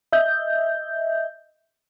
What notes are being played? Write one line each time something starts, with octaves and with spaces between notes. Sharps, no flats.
D#5 E5 G6